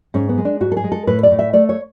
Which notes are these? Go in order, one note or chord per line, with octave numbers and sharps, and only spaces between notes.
G#2 C#4
B3
G#3
D4
G#2 F#4
A4
G#4
G#3
A4
A2 B4
D5
A2
E5
A3 D5
C#5